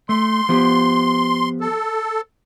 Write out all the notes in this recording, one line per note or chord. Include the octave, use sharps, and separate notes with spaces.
A3 C6
F3 B3 G4
A4